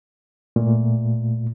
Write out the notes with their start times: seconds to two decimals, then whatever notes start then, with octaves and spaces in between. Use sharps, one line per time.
0.56 A#2 A3